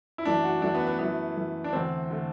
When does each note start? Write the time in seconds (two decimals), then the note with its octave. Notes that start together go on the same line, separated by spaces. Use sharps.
0.18 E4
0.25 F#2 E3 A3 D4
0.44 F#4
0.62 F#2 E3 A3 D4
0.75 B3
0.87 B3
0.99 F#2 E3 A3 B3
1.36 F#2 E3 A3
1.64 D4
1.73 E2 D3 A3 C4
2.11 D3 A3